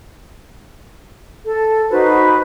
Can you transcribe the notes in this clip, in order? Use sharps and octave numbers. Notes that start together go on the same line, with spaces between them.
A4
D#4 F#4 B4 C5